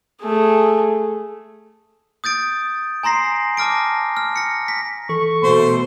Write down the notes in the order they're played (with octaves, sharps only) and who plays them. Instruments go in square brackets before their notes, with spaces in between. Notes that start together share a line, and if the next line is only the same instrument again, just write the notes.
[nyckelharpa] A3 G#4
[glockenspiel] D#6 G6 A6 D7
G#5 A#5 C6 A#6 C7
A5 D6 F6 A#6 D7
F6
A#6 C#7
B6
[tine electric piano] E3 A4 [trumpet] C#6
[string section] B2 A3 [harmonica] C5 C6